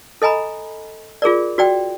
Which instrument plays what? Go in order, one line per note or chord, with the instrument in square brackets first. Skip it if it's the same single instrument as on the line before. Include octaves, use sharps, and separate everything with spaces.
[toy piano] A4 D#5 G#5 A#5 B5
F4 G#4 A#4 D5
F#4 D5 G5